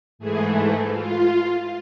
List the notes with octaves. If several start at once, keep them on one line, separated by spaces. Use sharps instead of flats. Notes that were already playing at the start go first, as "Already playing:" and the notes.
G#2 E3 A3 G#4
F4